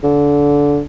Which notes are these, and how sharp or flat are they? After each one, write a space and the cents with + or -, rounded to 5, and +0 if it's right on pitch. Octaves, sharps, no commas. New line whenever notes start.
D3 -20